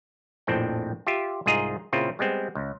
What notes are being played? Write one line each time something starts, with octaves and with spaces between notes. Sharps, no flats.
A#1 F2 A2 C4 G5
F4 G4 E5
C2 G#2 F4 G#4 D#5 A#5
A#2 C#3 C4 E4 F4
G3 G#3 B3 C4
C#2